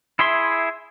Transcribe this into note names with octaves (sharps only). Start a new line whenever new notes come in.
E4 G#4 E5 C6